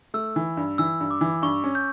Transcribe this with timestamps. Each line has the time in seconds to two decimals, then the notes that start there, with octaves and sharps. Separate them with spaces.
0.14 A3 E6
0.36 E3
0.57 G2
0.78 E3 E6
1.00 G2
1.11 D6
1.21 E3
1.42 G2 C#6
1.64 C#4
1.75 G6